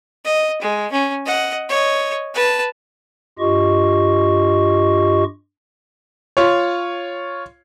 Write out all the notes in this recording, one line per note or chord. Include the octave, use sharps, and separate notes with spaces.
D#5
G#3
C#4
D#5 F#5
C#5 D#5
B4 A5
G2 F4 G4 D#5 C#6
F4 C#5